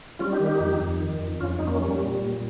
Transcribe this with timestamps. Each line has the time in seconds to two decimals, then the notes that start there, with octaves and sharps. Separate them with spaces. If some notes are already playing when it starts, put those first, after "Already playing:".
0.19 G3 C#4 F4
0.33 D#4 G4
0.40 D#3
0.46 D#4 G4
0.60 F2
0.80 F2
1.00 D#3
1.21 F2
1.40 F2 C#4 F4
1.59 F2 D#4
1.67 A#3 C#4
1.80 G3
2.01 A#2
2.21 A#2